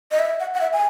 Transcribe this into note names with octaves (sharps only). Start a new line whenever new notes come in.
D#5
E5
F#5
F#5
E5
G#5